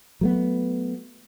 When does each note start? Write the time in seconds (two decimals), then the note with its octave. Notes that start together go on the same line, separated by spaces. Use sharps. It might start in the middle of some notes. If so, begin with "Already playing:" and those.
0.21 F#3 A3 B3